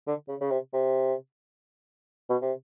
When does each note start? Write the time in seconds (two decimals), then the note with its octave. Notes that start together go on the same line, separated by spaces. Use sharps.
0.07 D3
0.28 C#3
0.41 C#3
0.51 C3
0.74 C3
2.30 B2
2.42 C3